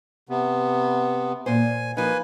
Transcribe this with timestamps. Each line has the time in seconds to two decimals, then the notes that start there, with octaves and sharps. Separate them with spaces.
0.29 C3 B3
1.46 A#2 C5 G#5
1.97 F3 A#3 D#4 B4 G#5